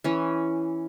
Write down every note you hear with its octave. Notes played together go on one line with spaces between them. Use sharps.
E3 C#4